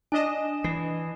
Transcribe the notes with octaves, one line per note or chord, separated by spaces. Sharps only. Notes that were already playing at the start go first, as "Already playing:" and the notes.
D4 D#5 G#5 E7
E3 C7